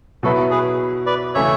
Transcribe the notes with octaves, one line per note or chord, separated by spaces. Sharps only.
B2 F#3 B3 E4 F#4 A4
G#4 B4
B4 D5
C#3 E3 A3 C#4 C#5 E5